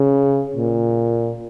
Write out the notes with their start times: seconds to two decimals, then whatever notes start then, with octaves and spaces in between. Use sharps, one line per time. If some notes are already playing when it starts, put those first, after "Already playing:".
Already playing: C#3
0.57 A#2